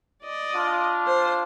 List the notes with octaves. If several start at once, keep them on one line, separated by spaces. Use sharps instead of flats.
D5 D#5
D4 F4
C5